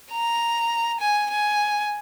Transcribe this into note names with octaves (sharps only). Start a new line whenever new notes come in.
A#5
G#5
G#5